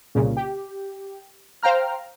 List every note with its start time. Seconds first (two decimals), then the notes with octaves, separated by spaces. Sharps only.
0.15 C2 A#2 C#3
0.37 G4
1.63 C5 F5 G5 A#5 F6